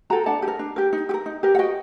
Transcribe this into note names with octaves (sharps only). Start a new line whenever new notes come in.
F#4 A4 G5 A#5
D4 F#5 A5
G4
A#4
D4
G4 A#4
D#4
G4
A#4
D#4
G4 A#4
F#5
F#4 D#5 G5